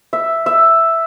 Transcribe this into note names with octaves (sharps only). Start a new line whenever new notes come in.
E5
E5